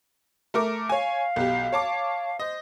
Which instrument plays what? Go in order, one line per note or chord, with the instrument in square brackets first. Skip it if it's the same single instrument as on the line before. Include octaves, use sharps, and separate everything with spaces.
[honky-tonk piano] A3 A#4 D6
[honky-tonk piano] C#5 G#5 [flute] F5
[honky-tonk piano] B1 G4
C#5 A5 D6
[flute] C5 [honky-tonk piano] D#5